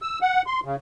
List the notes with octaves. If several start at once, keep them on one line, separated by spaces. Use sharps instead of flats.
E6
F#5
C6
C#3